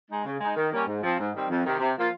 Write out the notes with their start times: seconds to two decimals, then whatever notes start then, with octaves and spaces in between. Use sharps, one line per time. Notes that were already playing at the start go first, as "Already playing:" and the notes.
0.10 G#3 D#4
0.24 C#3
0.40 G#3 D#4
0.56 D#3
0.71 G3 A#3 C#4 G4
0.86 G#2
1.02 F3 C4
1.18 G#2
1.33 D#3 G3 C4
1.49 F2
1.64 C3 D#3
1.79 C3
1.96 F3 A#3 F4